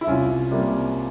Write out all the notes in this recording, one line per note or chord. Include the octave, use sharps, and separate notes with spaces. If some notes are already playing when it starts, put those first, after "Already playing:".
E4
C2 C#4 F4
C3 G3 A#3